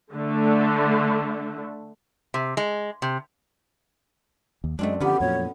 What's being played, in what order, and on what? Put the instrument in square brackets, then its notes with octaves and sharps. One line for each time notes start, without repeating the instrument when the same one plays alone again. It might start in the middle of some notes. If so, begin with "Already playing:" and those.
[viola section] D3 A3
[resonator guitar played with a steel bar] C3
G#3
C3
[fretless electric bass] D#2
[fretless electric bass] F#2 [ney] G#3 [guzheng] A3 C4 D4
[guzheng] F#2 B3 [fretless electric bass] D3 F3 [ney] G4
[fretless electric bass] F2 A#2 F#3 [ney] C#5